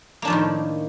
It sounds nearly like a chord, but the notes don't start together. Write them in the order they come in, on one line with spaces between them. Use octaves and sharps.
A#3 D4 F3 A2 D#3